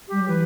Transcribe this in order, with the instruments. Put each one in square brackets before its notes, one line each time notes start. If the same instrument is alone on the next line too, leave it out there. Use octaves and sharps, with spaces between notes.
[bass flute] G3 [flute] G4
[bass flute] F#3
[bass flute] E3 [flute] B4